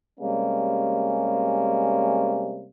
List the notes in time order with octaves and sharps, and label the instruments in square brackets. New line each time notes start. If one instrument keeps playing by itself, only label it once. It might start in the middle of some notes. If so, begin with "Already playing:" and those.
[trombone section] C3 G3 G#3 A#3 C#4